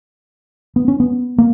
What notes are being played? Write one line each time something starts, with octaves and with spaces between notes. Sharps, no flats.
B3
C#4
B3
A#3